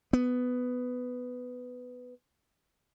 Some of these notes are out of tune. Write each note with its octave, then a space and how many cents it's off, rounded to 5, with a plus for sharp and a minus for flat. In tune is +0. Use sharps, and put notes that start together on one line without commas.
B3 +10